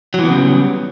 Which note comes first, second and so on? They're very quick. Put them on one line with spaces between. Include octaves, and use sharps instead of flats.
F#3 E3 B3 C#3 G3